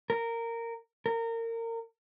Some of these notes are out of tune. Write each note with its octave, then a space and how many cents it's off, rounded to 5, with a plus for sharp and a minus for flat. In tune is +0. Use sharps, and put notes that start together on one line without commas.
A#4 -15
A#4 -25